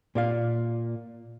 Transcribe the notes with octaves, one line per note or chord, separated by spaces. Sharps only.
A#2 D5 F5